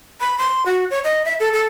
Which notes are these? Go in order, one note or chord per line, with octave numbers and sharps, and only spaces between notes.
B5
C6
F#4
C#5
D#5
E5
A4
A4